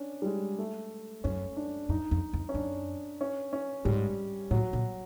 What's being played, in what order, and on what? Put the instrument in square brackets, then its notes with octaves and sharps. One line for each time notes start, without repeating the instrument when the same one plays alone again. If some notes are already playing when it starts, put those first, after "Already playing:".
Already playing: [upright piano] C#4 D4
G3
G#3
A3
[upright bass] F#2 [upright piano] C#4
[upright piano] D4
[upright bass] F#2 [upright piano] D#4
[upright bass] F2
F2
[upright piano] C#4
[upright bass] F#2 [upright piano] D4
[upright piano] C#4
C#4
[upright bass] G#2 [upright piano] G3
[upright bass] A2 [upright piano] F#3
[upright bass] A#2